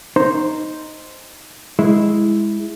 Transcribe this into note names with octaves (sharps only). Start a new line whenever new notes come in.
D#4 C5
G#3 E4